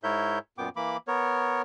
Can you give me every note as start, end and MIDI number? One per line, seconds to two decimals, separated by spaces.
0.04 0.39 44
0.04 0.39 64
0.04 0.39 70
0.04 0.39 73
0.04 0.39 76
0.04 0.39 91
0.58 0.69 42
0.58 0.69 46
0.58 0.69 59
0.58 0.69 79
0.58 0.69 86
0.76 0.97 52
0.76 0.97 58
0.76 0.97 83
0.76 0.97 86
1.08 1.62 59
1.08 1.62 70
1.08 1.62 73